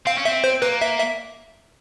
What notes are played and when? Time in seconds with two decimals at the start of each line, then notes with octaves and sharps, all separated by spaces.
0.06 C4 F5
0.18 C#4
0.25 C4 E5
0.44 C5
0.62 A#3 B4
0.82 E5
1.00 E5